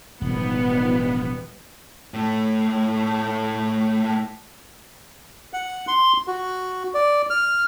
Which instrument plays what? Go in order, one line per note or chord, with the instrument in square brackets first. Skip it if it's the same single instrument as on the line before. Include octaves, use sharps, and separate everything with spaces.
[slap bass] E1 A2 [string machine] D#3 F3 G3 [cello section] B3
[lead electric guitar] A2 A3
[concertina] F#5
C6
F#4
D5
F6